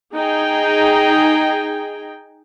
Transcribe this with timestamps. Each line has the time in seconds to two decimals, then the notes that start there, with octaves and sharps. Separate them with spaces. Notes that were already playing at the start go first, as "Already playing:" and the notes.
0.16 D#4 G#4 G5